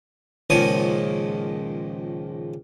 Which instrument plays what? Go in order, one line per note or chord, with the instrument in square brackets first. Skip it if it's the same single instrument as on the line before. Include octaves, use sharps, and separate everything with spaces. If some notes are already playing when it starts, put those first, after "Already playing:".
[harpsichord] C#2 A#2 D#3 F3 C#5 D#6